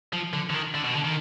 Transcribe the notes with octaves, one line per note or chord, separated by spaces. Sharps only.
F3
D3
D3
D#3
D3
B2
D3
D#3